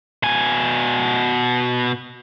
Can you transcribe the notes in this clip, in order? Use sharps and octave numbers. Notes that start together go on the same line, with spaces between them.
B2 G#5